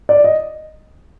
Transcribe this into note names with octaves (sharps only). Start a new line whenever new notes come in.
D5
D#5